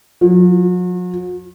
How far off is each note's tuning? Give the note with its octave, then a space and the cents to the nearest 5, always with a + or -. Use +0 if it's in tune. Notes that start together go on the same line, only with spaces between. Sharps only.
F#3 -45